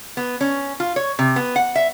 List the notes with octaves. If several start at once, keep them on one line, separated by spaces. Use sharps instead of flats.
B3
C#4
F4
C#5
C3
B3
F#5
E5